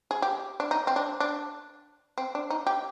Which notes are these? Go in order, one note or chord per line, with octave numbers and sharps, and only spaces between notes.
G#4
G4
D4
D#4
C4
D4
D4
C4
D4
D#4
G4